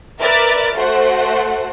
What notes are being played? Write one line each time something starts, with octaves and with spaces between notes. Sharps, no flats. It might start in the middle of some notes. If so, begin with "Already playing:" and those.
A#4 B4 D5 E5 F6 A6
A3 F#4 C5 F#5